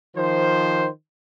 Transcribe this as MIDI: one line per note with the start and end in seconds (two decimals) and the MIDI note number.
0.17 0.87 51
0.17 0.87 53
0.17 0.87 72